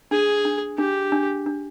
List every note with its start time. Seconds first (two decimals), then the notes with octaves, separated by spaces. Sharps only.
0.11 D4 G#4
0.45 D4
0.78 D4 G4
1.12 D4
1.46 D4